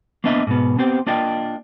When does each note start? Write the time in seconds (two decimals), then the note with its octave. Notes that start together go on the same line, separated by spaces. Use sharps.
0.24 A#3 B3 D4 D#5 E5
0.47 G#2 B2 B3
0.78 B3 C4 G4 C5
1.07 A#3 D4 F4 D#5 G5